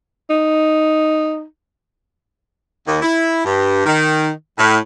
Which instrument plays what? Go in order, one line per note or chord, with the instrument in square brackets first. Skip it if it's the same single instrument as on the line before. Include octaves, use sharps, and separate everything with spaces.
[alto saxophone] D#4
[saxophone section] D#2
E4
G2
D#3
A2